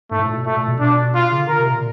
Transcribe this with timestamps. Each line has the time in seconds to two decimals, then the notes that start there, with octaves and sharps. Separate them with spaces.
0.11 G#2 A3
0.19 A2
0.28 A#2
0.37 B2
0.45 A#2 A3
0.57 A#2
0.68 B2
0.79 D4
1.14 F4
1.31 C#3
1.40 D3
1.48 A#4
1.59 C3
1.71 A#2